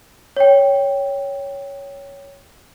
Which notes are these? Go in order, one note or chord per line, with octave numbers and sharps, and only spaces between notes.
C#5 G5